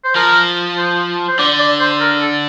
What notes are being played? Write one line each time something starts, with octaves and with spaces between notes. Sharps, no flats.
C5
F3 A#4
C5
C5
D3 D5
D5
C5
A#4
A4